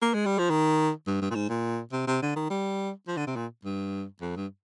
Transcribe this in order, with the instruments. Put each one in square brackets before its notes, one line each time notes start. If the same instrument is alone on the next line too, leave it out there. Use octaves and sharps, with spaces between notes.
[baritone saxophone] A#3
G#3
G3
F3
D#3
G2
G2
A#2
G#2
A#2
C3
C3
D3
D#3
G3
F3
D3
C3
A#2
G2
F2
G2